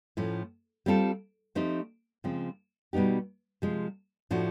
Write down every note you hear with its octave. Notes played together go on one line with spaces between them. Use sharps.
A2 F3 A3 C#4
G3 C4 F4 A4
F3 A3 C4 D#4 G4
C#3 F3 G#3 C4
B2 G3 B3 D#4 G4
C3 F3 G#3
A2 F3 A3 D4 F#4